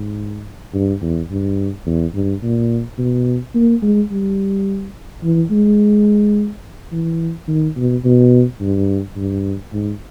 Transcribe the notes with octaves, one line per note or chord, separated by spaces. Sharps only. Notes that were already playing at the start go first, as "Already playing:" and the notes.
Already playing: G#2
G2
E2
G2
E2
G2
A#2
B2
A#3
G#3
G3
E3
G#3
E3
D#3
B2
B2
G2
G2
G#2